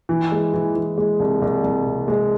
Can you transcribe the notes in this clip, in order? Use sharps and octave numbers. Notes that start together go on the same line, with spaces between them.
E3
G#3
E3
E3
G#3
C2
C2
C2
C3
G#3